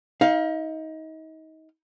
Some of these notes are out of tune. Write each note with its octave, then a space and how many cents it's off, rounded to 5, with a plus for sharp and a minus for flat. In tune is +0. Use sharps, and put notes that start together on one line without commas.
D#4 +30 F5 +0